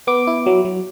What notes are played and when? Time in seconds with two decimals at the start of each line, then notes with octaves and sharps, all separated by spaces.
0.07 B3 D6
0.27 E4
0.46 F#3
0.65 F#3